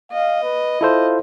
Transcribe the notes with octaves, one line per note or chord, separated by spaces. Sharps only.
D#5 F5
B4
E4 F4 A4 C5